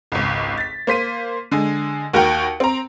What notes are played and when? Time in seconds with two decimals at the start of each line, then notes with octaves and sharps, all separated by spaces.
0.12 G#1 C#2
0.58 A6 B6
0.87 A#3 C5 B6 D#7
1.51 D3 G#3 G#5
2.13 D#2 F#4 A#4 G5 C#7
2.60 C4 A#5